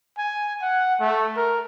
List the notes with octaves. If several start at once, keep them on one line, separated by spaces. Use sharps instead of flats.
G#5
F#5
A3
A#4